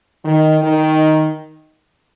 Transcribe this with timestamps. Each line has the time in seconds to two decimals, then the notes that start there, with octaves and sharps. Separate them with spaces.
0.24 D#3
0.61 D#3